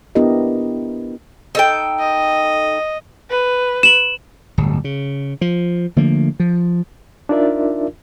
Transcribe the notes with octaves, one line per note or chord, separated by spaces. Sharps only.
B3 D4 E4 G4 A#4 D#5
D#4 A4 G5
D#5
B4
E7 F#7
D1 G1
C#3
F3
D3 F3 A3 A#3
F3
D4 D#4 F4 A#4 D5 E5